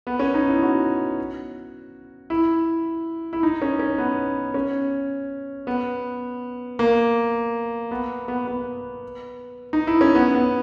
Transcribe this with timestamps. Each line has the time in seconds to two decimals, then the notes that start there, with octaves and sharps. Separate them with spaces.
0.07 B3
0.20 C#4
0.34 D#4
0.49 E4
0.63 F#4
2.30 E4
3.33 E4
3.43 D#4
3.62 C#4
3.80 C#4
3.98 B3
4.54 C#4
5.67 B3
6.79 A#3
7.91 B3
8.28 B3
8.47 B3
9.73 D#4
9.87 E4
10.01 C#4
10.15 B3
10.35 B3